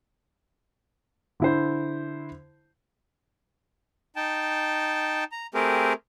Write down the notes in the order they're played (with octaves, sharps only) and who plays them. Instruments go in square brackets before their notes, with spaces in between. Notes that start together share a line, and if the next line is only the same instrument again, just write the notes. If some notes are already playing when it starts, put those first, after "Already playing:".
[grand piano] D3 E4 C5
[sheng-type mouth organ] D#4 G5 A5
A#5
A3 C4 G4 G#4 A#4